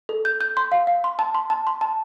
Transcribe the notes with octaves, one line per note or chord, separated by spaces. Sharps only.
A4
G6
G6
C6
F5
F5
C6
A5
C6
A5
C6
A5